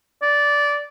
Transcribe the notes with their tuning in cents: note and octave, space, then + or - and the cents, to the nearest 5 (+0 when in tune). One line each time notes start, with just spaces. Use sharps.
D5 -15